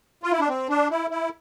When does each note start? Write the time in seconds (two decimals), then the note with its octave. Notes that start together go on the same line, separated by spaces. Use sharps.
0.23 F4
0.32 E4
0.40 D4
0.49 C4
0.69 D4
0.91 E4
1.10 E4